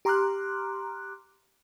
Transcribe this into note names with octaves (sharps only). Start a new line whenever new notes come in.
G4 A#5 C6 D6 F6 F#6